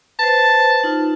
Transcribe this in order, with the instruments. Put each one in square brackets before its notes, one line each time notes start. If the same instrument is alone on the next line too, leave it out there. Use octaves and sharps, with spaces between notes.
[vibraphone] B4 C5 [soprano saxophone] A5
[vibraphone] D#4 F4